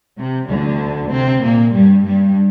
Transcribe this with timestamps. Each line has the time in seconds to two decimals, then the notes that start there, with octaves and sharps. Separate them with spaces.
0.17 C3
0.48 D2 D3
1.11 C3 C4
1.43 A#2 A#3
1.73 G2 G3
2.05 G2 G3